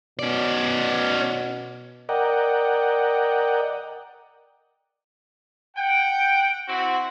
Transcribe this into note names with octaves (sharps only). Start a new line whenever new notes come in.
B2 C#4 D5
A#4 D5 D#5 F#5 G5
F#5 G5
C4 E4 F#4